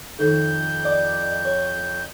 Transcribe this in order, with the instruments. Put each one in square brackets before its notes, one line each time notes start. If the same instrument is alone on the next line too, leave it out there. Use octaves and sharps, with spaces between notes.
[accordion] F2 G6 [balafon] D#3 D#4 A4
[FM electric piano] D5 D#5 D6
C#5